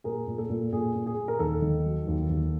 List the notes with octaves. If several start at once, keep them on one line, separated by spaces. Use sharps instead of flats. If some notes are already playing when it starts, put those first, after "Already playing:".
A#2 G#4 A#4
A#2
A4
A#2
A#2 G#4
A#2
G#4
A#2
A#4
D#2 A4
D#3
F#3
D#2
D#2